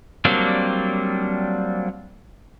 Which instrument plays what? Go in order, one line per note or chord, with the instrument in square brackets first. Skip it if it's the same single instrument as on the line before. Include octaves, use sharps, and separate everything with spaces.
[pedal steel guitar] F#3 G3 A#3 C4 D4